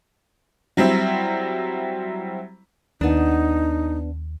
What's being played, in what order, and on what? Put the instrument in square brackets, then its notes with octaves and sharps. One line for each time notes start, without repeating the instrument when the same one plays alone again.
[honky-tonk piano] F#3 G3 C4 E4
[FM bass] D#2 [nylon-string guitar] B3 D4 [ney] D#4